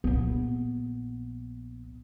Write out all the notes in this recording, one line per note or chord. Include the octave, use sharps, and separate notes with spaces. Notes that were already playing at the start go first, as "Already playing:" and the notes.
A#1 B3